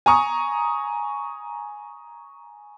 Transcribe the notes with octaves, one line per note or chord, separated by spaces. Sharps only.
G#5 A#5 C#6 D#6